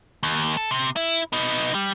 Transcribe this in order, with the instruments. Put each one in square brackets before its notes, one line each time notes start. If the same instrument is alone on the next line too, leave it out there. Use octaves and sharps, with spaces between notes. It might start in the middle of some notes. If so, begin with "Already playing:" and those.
[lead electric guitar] D#2
A4
C3
E4
B3 D#4
G3